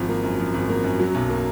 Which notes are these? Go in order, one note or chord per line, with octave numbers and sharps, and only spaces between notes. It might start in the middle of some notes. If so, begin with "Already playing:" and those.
Already playing: G#1 F3
A#3
F#2
F3
G#1
A#3
F#2
F#3
B1
A#3